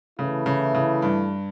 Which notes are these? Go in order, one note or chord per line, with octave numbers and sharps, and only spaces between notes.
C#3 E3 A3 E4
C#3
C#3
G2